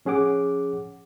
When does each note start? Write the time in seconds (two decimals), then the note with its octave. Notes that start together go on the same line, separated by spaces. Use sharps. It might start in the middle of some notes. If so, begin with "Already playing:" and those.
0.05 F3 C#4 G#4 F#5 D6